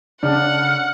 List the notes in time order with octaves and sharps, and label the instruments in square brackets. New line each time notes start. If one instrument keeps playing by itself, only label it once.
[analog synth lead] C#3 [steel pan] D4 [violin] F#5 [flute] F6